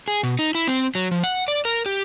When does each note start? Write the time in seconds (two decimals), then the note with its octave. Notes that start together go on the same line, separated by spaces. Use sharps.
0.08 G#4
0.23 B2
0.39 D#4
0.55 E4
0.68 C4
0.95 F#3
1.11 F3
1.24 F#5
1.48 D5
1.65 A#4
1.86 G4